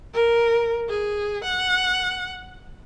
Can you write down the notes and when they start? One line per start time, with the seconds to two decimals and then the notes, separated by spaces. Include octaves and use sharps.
0.14 A#4
0.89 G#4
1.44 F#5